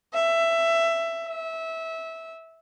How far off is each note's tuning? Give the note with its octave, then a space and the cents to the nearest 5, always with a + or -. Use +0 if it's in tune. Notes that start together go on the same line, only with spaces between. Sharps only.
E5 +15
E5 -20